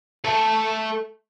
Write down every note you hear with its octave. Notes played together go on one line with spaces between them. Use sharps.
A3 A4